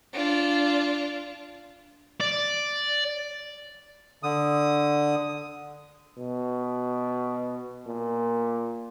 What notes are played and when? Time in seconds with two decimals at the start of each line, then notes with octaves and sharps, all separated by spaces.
0.13 D4 F4
2.21 D5
4.23 D3 D#6
6.18 B2
7.87 A#2